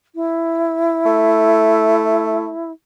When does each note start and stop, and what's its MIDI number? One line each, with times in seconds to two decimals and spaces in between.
0.15 2.72 64
1.06 2.51 57